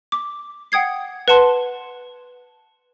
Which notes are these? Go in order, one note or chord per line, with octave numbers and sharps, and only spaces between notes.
D6
F#5 G5 D#6 G#6 C7
B4 F#5 A5 C6